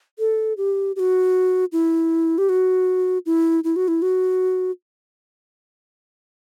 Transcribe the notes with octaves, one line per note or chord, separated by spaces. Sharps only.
A4
G4
G4
F#4
E4
G4
F#4
E4
E4
F#4
E4
F#4